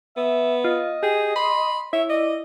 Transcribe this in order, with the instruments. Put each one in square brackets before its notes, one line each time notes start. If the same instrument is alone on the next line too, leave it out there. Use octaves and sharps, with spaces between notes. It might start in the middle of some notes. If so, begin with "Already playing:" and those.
[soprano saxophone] B3 [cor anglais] E5
[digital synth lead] F4 [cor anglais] D#5
[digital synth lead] G4 [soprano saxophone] G#4
[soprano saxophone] B5 [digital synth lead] C6
[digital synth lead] E4 [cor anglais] C#5 [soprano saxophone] E5
[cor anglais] D5 [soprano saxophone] D#5